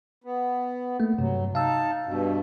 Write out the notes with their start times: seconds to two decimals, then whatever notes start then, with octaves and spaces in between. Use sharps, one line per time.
0.24 B3
1.00 A3 A#3
1.19 G2 C3 F#3
1.55 D#4 F5 A5 E6
2.06 G2 B2